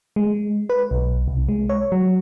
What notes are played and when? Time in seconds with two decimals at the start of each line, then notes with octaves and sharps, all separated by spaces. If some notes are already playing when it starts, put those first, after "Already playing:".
0.16 G#3
0.70 B4
0.91 B1
1.28 C2
1.49 G#3
1.69 C#5
1.92 F#3